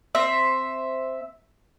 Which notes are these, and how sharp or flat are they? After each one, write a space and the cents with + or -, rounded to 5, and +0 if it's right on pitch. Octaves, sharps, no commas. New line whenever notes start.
C4 +0 E5 +0